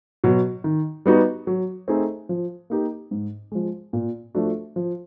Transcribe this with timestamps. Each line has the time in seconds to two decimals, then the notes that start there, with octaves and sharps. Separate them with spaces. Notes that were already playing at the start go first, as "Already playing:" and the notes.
0.24 B2 F#3
0.64 D#3
1.06 G3 B3 D#4 F#4
1.47 F#3
1.88 A3 C4 D#4 G#4
2.29 F3
2.70 A#3 D#4 G4 A#4
3.11 G#2
3.52 F3 G#3
3.93 A#2
4.35 F3 A3 D4 F#4
4.76 F3